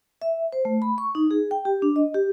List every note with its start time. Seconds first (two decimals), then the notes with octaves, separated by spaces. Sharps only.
0.22 E5
0.52 C5
0.65 A3
0.82 B5
0.98 C#6
1.15 D#4
1.31 G#4
1.51 G5
1.65 G4
1.82 D4
1.96 D#5
2.14 G4